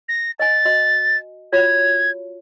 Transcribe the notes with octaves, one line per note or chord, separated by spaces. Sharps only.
A#6
D#5 G#5 A6
F#4 D#5
F4 F#4 C#5 G#6